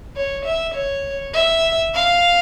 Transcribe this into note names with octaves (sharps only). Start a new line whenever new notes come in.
C#5
E5
C#5
E5
F5